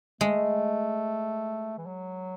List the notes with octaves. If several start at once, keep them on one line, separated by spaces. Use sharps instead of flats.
G#3 A3
E3
F#3